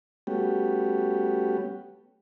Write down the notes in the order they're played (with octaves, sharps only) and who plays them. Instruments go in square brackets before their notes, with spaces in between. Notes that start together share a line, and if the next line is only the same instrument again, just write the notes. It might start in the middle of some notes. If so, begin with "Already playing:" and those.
[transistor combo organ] G3 A3 B3 C#4 F#4 G4